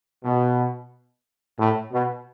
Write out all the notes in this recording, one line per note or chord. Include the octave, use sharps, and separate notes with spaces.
B2
A2
B2